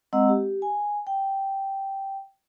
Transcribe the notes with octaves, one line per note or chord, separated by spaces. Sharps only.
G#3 C4 D#5 F#5 A#5 E6
G4
G#5
G5